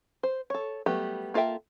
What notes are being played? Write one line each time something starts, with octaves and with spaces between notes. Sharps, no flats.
C5
A4 C#5
F#3 G3 A3 B3 G4
A#3 F4 A4 E5 G5